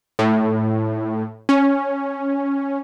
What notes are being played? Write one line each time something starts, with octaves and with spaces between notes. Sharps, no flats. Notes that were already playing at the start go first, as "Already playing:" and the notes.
A2
C#4